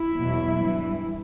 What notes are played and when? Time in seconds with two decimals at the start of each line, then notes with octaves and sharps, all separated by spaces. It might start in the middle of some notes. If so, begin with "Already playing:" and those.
Already playing: E4
0.16 E2 B2 F#3
0.56 G2 E3